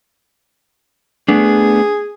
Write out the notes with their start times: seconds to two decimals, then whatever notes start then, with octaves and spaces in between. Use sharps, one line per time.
1.28 A3 B3 D4 G#4